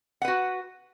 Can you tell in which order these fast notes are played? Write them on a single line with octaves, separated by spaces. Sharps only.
F#5 B4 F#4